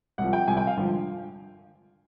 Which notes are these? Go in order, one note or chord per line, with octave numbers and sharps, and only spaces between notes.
C2 C3 F3 F#5
G5
C2 C3 F3 G#5
G5
F5
G#1 G2 D3 F3